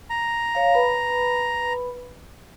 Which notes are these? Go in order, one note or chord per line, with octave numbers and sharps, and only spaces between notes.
A#5
C#5 F5
B4 B5